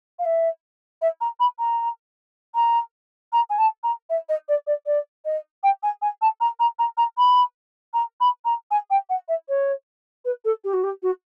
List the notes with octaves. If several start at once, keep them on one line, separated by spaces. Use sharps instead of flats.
F5
E5
E5
A#5
B5
A#5
A#5
A#5
G#5
A5
A#5
E5
D#5
D5
D5
D5
D#5
G5
G#5
G#5
A5
A#5
A#5
A#5
A#5
B5
A#5
B5
A#5
G#5
G5
F#5
E5
C#5
B4
A4
G4
F#4
G4
F#4